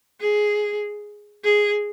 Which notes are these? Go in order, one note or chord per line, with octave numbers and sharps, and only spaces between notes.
G#4
G#4